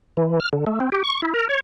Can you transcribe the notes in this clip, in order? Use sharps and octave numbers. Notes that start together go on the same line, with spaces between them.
E3
F6
D3
A3
C4
G4
C#6
E4
A#4
C#5